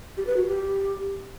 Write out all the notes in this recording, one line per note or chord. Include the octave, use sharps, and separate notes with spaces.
G4
B4
F#4
G4